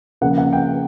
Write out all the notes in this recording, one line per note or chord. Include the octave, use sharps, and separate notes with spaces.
C#3 F3 A#3 F#5
F#5
G5